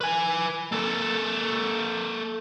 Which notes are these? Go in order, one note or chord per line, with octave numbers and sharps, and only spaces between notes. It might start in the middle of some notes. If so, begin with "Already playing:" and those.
B4 G#5
A#3 A4